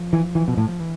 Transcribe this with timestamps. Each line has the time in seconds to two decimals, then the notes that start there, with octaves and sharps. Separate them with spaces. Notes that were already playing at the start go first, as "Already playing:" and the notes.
Already playing: F3
0.13 E3
0.35 E3
0.48 B2
0.57 A2
0.68 F3
0.80 E3